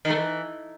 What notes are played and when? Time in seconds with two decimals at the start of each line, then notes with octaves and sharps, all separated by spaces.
0.05 D#3
0.10 A3
0.15 E3